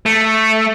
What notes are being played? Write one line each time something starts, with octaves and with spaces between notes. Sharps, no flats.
A3